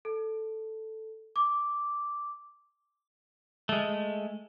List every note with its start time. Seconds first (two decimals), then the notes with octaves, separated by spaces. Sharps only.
0.05 A4
1.36 D6
3.69 G#3 A3